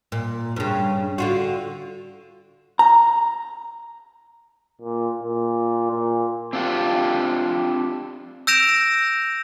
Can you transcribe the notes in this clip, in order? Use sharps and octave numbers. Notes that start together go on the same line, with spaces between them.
A#2
G2 C#3
D3 F4 F#4
A#5
A#2
A#2
A#2
C4 D4 F4 G4
E6 G6 A#6 D7 E7 F7